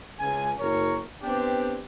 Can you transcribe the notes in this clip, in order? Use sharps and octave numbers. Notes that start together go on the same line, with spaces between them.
C#2 G#5
F#1 A#4 C#5
B3 C4 D4 G4